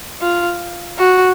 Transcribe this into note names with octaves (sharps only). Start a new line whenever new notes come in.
F4
F#4